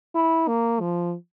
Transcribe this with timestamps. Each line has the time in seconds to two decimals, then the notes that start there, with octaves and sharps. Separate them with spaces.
0.15 E4
0.47 A#3
0.80 F3